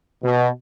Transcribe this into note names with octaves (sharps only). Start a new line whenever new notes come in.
B2